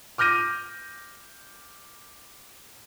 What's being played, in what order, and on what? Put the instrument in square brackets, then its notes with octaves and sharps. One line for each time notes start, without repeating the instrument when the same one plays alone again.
[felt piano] D6 F6 G6 A#6 D#7